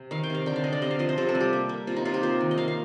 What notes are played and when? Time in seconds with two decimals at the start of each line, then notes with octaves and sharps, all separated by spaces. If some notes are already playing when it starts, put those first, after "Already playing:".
Already playing: C3
0.11 D#3 F5
0.23 G5
0.30 C3 F5
0.46 D3 G5
0.56 F5
0.64 D3 D#5
0.72 D5
0.82 C3 D#5
0.91 F5
0.99 F3 D#5
1.09 C5
1.18 C3 A4
1.29 A4
1.35 G3
1.40 G4
1.53 A#3
1.69 A#3
1.87 C3 F4
1.96 D#4
2.05 C3 F4
2.14 G4
2.23 A#3 C5
2.41 D#3
2.51 D#5
2.58 A#3 F5
2.68 F5